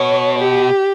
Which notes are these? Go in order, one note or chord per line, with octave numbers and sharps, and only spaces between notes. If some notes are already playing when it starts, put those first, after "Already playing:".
Already playing: B2 C#5
G4